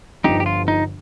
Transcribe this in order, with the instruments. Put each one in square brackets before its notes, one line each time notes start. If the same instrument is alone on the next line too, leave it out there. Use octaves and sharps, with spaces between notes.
[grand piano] G1 G2 D3 F3 [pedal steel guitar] D#4 G4
[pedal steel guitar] G4
F4
D#4